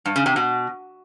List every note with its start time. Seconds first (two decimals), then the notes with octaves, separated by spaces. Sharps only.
0.05 G2
0.16 C#3
0.26 C3
0.36 B2